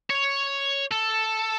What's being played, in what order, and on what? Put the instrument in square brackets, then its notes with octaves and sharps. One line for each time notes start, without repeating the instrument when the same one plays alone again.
[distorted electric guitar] C#5
A4